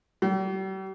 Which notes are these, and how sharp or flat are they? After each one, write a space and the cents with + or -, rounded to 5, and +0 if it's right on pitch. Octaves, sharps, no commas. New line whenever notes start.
G3 -40